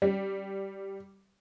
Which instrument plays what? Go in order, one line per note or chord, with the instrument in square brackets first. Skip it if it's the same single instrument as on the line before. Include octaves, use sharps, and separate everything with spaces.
[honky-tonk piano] G3